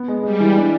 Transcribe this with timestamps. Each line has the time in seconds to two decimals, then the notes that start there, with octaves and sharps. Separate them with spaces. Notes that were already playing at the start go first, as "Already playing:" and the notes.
Already playing: B3
0.08 G#3
0.23 G3 G#3
0.40 E3
0.56 D4